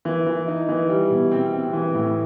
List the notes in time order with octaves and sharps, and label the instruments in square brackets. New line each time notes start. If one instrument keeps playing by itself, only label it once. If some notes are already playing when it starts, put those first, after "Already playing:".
[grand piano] E3
E3
D#4
E3
G3
B2
C4
C4
E3
A2